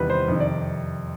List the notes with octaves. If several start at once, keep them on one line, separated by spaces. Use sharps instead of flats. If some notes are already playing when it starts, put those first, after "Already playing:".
Already playing: E2 C3 D#3 G3 B4
C5
F2 C3 D#3
D5